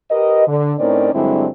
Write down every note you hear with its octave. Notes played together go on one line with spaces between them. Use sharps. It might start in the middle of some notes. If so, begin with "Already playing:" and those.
G4 A#4 B4 D#5
D3
A2 C4 C#4 D#4 A#4 D5
G2 D3 F#3 G#3 C4 E4